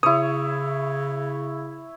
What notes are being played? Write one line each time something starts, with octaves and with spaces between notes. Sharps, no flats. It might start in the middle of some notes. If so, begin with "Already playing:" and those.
C#3 E4 C#5 D#6